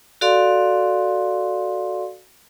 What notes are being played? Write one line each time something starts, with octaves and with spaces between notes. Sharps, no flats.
F#4 A4 D5 F5 C6